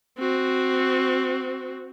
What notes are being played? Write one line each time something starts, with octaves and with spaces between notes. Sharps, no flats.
C4 F#4